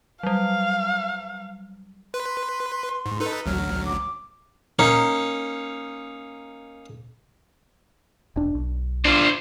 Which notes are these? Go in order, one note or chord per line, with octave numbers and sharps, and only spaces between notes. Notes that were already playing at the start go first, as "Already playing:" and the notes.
F#3 G3 F5
B4 C6
G#2
D#4 A4 B4
A1 D2 F#3 F6
D6
A#3 C#4 D#4
E1 D4
B1
D4 F4 C5 D5